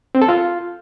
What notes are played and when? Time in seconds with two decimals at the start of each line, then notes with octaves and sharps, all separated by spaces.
0.15 C4
0.22 A4
0.28 F4